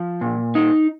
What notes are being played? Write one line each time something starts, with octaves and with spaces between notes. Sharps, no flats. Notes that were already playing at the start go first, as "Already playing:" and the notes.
Already playing: F3
A#2
D#4